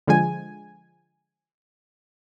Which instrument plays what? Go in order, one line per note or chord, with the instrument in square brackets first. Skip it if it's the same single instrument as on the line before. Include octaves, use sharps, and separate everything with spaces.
[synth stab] D3 F3 G#3 G#5